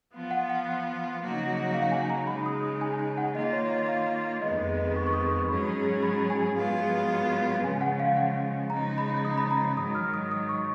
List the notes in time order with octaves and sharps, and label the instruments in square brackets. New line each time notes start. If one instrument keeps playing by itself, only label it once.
[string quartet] F3 B3 F4
[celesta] F#5
F#5
[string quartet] C#3 F#3 A#3 D#4 F#4
[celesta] F5
G#5
A#5
[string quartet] C#3 G#3 D#4 [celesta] B5
[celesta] D#6
D#6
G#5
G#5
F#5
[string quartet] D#3 A#3 F4 [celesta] D#5
[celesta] C#5
D#5
F5
[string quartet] F2 D#3 G#3 B3 [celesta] D#5
[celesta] D#5
D#5
C#6
C#6
D#6
C#6
[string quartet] G#2 F#3 C#4 G#4 [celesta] B5
[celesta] B5
G#5
[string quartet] G#2 F#3 B3 F4 G#4
[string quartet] C#3 F3 G#3 C#4 [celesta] G#5
[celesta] F#5
F5
F#5
[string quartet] C#3 F3 G#3 D#4 [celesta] A#5
[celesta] B5
D#6
A#5
B5
A#5
B5
[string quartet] G#2 D#3 F#3 [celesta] D#6
[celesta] F6
D#6
D#6
C#6